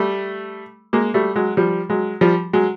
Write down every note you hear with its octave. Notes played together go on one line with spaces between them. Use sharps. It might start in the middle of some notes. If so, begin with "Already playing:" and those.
Already playing: G3 A3
G#3 A#3
G3 A3
F#3 G#3
F3 G3
F#3 G#3
F3 G3
F#3 G#3